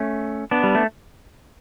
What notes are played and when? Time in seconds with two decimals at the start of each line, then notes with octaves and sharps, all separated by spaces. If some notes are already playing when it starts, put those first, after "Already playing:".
Already playing: A3 C#4
0.51 B3 D4
0.63 G3
0.75 A3